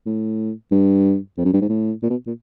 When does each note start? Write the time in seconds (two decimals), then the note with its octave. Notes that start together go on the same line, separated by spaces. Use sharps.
0.06 A2
0.71 G2
1.37 F2
1.45 F#2
1.53 G2
1.61 G#2
1.69 A2
2.03 A#2
2.10 B2
2.26 A#2